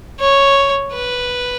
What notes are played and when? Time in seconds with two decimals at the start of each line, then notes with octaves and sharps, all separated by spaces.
0.20 C#5
0.93 B4